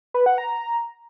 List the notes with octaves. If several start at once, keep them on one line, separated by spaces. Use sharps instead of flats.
B4
F#5
A#5